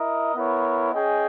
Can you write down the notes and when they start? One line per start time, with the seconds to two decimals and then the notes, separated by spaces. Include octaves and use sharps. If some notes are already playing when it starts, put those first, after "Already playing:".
Already playing: E4 A#4 D#5
0.35 B3 E4 A#4 C#5
0.92 C#4 G#4 D#5 G5